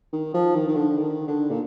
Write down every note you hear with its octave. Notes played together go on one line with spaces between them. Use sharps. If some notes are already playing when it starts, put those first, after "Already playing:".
D#3
F3
D#3
D#3
D3
D#3
D3
A#2